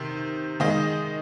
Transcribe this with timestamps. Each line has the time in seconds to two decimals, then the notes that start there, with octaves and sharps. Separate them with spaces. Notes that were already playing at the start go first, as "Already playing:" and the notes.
Already playing: C3 D#3
0.60 D#3 G#3 D#5